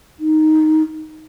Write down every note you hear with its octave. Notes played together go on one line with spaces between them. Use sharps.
D#4